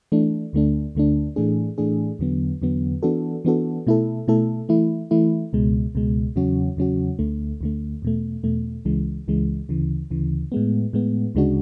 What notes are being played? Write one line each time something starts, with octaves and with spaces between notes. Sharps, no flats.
E3 A3 D4
D2 D3 A3 D4
D2 D3 A3 D4
A2 E3 A3 D4 G#4
A2 E3 A3 D4 G#4
E2 D3 F#3 B3
E2 D3 F#3 B3
E3 B3 D4 F#4 A4
E3 B3 D4 F#4 A4
B2 A3 E4 A4
B2 A3 E4 A4
E3 A3 E4
E3 A3 E4
C#2 B2 G#3
C#2 B2 G#3
E2 C#3 F#3 C#4 F#4
E2 C#3 F#3 C#4 F#4
D2 D3 A3
D2 D3 A3
E2 B2 A3
E2 B2 A3
C#2 C#3 E3 G#3
C#2 C#3 E3 G#3
D2 C#3 E3
D2 C#3 E3
A2 G#3 B3
A2 G#3 B3
D2 C#3 G#3 D4 F#4